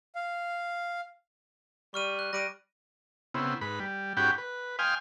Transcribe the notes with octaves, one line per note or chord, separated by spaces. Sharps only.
F5
G3 C#6 F6 D#7
F#6
G3 A#6 D7 D#7
C#3 B3 C4 E4
G#2 B4 B5
G3
G#2 C#4 F#4 G4 G5 B5
B4
F5 G5 G#5 C6 D#6 F6